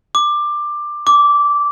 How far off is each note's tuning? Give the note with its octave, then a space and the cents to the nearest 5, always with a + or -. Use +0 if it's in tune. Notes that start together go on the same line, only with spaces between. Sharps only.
D6 +15
D6 -15